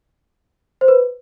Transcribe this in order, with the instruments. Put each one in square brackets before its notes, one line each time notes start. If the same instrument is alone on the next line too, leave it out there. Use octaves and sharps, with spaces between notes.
[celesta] C5
B4